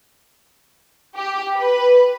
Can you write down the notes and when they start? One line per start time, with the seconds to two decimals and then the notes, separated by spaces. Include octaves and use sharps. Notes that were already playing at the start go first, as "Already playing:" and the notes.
1.17 G4
1.56 B4